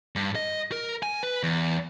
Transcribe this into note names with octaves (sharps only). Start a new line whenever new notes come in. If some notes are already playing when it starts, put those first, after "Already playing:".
G2
D#5
A#4
G#5
B4
E2